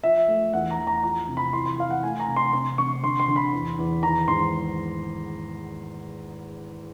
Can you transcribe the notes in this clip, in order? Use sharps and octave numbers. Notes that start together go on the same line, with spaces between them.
F3 E5
A3
E2 F#5
A#5
E2
A#5
F3 A#5
C3
B5
E3 C6
C6
E3 F5
F#5
A3 G#5
A#5
C3
C6
C3 C6
C3 C#6
D3 C6
C6
D3
B5
E2
E2
D#3 A#5
G#2 C6